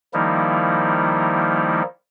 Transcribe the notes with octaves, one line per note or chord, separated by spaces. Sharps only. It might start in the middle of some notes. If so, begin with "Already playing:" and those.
D#3 F3 G3 A#3 D#4 E4